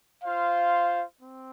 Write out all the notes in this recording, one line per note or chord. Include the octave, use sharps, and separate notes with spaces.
F4 C5 F5
C4